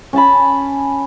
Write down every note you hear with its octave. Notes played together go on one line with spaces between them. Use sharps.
C#4 G#5 A5 B5